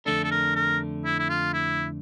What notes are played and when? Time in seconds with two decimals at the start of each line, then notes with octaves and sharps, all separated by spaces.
0.06 F2 D3 A3 D4 A4
0.24 A4
0.31 A#4
0.55 A#4
1.05 E4
1.19 E4
1.29 F4
1.53 E4